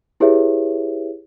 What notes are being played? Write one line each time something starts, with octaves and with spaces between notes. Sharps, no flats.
E4 G4 G#4 B4 C#5 E5